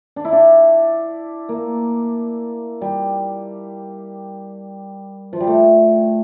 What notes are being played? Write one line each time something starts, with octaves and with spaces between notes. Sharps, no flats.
D4
E4
D4
A#3
G3
F3
G3
A3